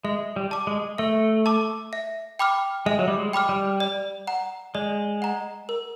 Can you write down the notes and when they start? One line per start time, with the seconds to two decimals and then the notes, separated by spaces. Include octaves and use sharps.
0.04 G#3 E5
0.36 G3
0.51 A5 D6
0.67 G#3
0.98 A3 E5
1.46 A5 D6
1.93 E5
2.39 G5 B5 D6 F6
2.86 G#3 E5
2.99 F#3
3.08 G3
3.18 G#3
3.33 G5 B5 D6 F6
3.49 G3
3.80 D5
4.27 F#5 A#5
4.75 G#3 D5
5.22 F#5 A#5
5.69 A#4